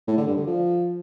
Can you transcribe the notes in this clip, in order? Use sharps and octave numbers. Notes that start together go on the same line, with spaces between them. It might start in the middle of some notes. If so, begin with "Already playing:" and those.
A2
D3
G2
D3
F3